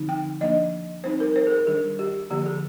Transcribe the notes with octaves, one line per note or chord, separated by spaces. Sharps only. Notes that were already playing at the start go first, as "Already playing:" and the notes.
Already playing: D3 F3 C4 D#4
G5
F3 A#3 D4 D#5
G3 C4 D#4 C5
A#4
C5
G#4
A#4
D#3 G3 D4 G#4
G4
D3 F3 A#3 G4
G#4